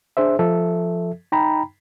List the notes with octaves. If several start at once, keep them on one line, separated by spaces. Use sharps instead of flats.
D4 G#4 C5 E5
F3 A4 E5
D#4 G5 A#5 B5